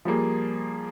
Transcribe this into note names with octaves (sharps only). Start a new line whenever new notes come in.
F3 G3 A#3 G#4